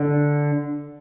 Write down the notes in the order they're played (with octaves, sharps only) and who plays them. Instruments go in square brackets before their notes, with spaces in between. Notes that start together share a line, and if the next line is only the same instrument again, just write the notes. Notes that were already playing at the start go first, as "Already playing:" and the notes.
Already playing: [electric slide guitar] D3